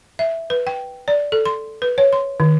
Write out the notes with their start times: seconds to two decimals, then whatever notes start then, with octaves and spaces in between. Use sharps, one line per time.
0.19 E5
0.50 B4
0.67 G5
1.08 D5
1.32 A4
1.45 C6
1.82 B4
1.98 C#5
2.13 C6
2.40 D#3